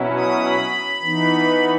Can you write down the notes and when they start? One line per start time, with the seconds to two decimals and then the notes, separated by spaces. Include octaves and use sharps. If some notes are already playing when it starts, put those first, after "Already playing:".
Already playing: B2 F#3 C#4 E4
0.16 D#6
0.45 B5
1.01 E3 B3 D#4